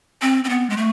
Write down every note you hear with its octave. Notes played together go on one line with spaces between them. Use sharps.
C4
C4
B3
G#3
A3